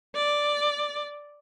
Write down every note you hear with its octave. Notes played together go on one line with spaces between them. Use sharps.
D5